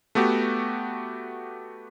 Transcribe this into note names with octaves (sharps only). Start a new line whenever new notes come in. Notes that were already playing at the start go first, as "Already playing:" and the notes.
A3 B3 F#4 G4